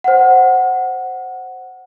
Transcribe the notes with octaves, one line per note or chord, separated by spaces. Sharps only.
C5 F#5